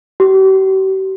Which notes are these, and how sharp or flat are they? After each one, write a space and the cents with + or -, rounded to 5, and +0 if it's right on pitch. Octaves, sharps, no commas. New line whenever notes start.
G4 -45